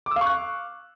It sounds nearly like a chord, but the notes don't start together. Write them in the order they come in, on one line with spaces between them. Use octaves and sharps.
D6 E6 F5 C#6 F#6